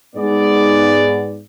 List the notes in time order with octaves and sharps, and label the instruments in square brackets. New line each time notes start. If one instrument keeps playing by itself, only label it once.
[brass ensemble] G#2 B3 G#4 D5